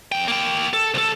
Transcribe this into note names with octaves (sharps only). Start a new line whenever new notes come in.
F2 G5
A#3 G5
A4
C2 A4